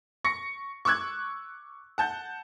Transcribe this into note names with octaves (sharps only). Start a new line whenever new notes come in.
C#6 A#6 C#7
C#6 D6 E6 F#6 G#6
F#5 A5 G6